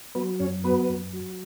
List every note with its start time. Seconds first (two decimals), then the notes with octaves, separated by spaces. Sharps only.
0.15 F#3 B3 B4
0.39 F#2 C#4 C#5
0.64 F#3 B3 B4
0.89 F#2
1.13 F#3